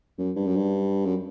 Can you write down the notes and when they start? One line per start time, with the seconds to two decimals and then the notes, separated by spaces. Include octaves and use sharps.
0.18 F#2
0.36 G2
0.47 F#2
0.56 G2
1.05 F#2